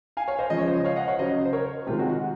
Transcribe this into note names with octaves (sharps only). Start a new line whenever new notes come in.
F5 G#5
C#5 F5
C5 D#5
C#3 F3 G#3 D#5
C#5
C5 D#5
C#5 F5
D#5 F#5
C#5 F5
C#3 F#3 C5 D#5
C5
A#4 C#5
C3 D#3 G#3 F4
F#4
F#4